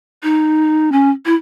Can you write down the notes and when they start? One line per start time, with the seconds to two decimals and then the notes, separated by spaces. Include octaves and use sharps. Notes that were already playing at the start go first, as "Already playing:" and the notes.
0.23 D#4
0.92 C#4
1.26 E4